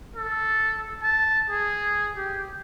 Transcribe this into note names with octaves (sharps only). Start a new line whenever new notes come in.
A4
A5
G#4
G4